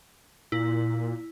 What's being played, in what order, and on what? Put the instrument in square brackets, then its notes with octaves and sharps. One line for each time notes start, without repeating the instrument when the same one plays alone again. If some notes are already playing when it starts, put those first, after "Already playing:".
[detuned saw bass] A#2 [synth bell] E4